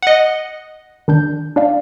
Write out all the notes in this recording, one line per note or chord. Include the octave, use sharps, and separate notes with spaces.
D#5 F#5
D#3 D4 G6
D4 D5 F5